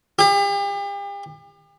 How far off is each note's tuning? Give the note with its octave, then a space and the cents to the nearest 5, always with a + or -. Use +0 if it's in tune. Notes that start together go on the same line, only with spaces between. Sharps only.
G4 +40